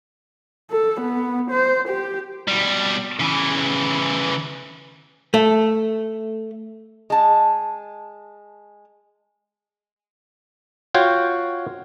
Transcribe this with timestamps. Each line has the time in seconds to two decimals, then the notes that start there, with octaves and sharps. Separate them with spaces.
0.71 A4
1.01 B3
1.51 C5
1.89 G4
2.48 B2 G3
3.20 C#3 E3
5.34 A3
7.10 G#3 A5
10.95 F4 F#4 C#5 F5 G5